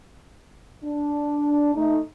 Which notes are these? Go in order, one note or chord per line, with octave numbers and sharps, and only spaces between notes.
D4
A3 D#4